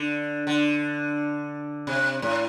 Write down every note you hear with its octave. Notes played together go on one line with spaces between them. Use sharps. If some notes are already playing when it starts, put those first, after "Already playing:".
Already playing: D3
D3
C3
A2